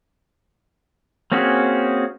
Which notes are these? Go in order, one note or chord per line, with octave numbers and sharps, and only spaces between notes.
A#3 C4 C#4 F#4 G#4